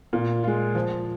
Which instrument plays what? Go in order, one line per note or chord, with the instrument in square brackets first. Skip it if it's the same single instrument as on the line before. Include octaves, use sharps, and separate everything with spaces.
[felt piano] A#2
G#3 F4
F3